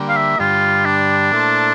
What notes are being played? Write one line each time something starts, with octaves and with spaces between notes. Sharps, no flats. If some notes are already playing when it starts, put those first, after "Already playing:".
Already playing: D3 G3 A#3
F5
E5
G2 D3 G3 F4
D4
A#2 A3 E4 A4 C5